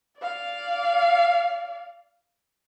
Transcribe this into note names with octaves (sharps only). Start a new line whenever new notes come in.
D5 F5